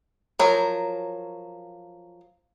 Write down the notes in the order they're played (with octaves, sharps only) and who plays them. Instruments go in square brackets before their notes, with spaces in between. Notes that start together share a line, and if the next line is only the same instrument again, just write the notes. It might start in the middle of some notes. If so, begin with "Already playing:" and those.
[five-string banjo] F3 F#3 A#4